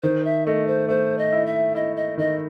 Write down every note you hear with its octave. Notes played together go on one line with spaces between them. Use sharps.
D#3 C5
E5
A3 D#5
C5
A3 C5
D#5
E4
E5
E4 D#5
D#5
D#3 D#5